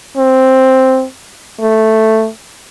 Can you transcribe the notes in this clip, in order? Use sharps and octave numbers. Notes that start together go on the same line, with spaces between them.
C4
A3